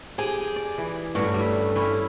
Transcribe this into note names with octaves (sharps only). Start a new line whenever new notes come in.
G4 G#4 G#5
D5
E3
G2 A3 C#4 F#4
G3 E5
C#4 E4 B4